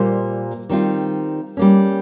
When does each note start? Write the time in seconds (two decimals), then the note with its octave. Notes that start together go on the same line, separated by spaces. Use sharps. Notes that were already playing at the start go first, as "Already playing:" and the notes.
Already playing: A#2 G3 A#3 F4 C5
0.69 D#3 G3 C4 F4
1.57 G3 A#3 C#4